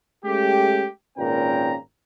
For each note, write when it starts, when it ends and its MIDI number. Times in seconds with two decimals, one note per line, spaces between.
0.25 0.87 56
0.25 0.87 57
0.25 0.87 61
0.25 0.87 67
1.18 1.75 32
1.18 1.75 46
1.18 1.75 61
1.18 1.75 71
1.18 1.75 79
1.18 1.75 82